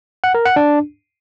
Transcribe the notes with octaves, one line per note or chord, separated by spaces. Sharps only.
F#5
A#4
F#5
D4